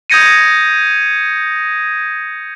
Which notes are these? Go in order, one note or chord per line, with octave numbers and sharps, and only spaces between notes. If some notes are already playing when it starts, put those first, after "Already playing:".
D#6 G6 G#6 A#6 C#7 D#7